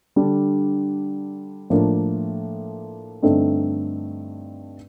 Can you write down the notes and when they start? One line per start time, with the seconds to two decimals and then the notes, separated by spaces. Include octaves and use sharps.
0.16 D3 G3 D4
1.70 A2 F3 A#3 D4
3.22 G2 D3 A3 C4 D#4